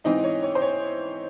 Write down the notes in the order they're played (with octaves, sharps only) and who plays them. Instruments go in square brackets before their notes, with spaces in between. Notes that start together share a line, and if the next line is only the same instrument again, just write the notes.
[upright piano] G#2 E3 C4 D#4 D#5
C#5
C#5
C5
C#5